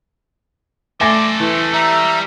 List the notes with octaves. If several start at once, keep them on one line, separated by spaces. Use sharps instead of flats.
A3 A4 C5 D5 G#5 A#6
E3 A3
G3 E5 A#5